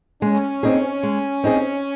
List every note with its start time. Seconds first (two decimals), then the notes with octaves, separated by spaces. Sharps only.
0.22 G#3 C#4
0.63 C4 D#4 G#4
1.03 G#3
1.44 C4 D#4 G#4